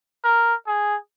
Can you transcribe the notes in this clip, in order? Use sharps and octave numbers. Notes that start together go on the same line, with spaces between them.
A#4
G#4